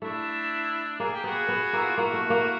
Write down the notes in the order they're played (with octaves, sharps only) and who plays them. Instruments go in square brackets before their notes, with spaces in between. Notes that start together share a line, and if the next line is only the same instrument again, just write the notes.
[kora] A3 [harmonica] D4 E4
[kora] A#3 [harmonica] G#4
[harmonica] G4
[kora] B3 [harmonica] F#4 G#4
[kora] B3
[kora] A#3 [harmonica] E4
[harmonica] F4
[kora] A#3 [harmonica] E4 F#4
[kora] A3
A#3